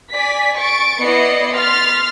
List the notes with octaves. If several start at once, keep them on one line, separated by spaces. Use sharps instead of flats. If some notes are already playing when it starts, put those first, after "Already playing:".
D5 G#5 B6
C#6 A6 D7
B3 E4 D5 D#5 C7 C#7
C6 F6 A6 B6